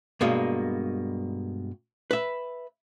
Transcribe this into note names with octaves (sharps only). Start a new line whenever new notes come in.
G2 B2 G#3 A#3
B4 E5